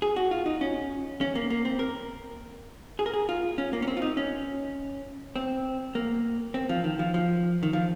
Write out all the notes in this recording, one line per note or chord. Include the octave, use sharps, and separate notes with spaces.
G#4
F#4
F4
D#4
C#4
C#4
A#3
A#3
C4
A#4
G#4
A#4
G#4
F4
C#4
A#3
C#4
C4
F4
D#4
C#4
C4
A#3
C4
F3
D#3
F3
F3
D#3
F3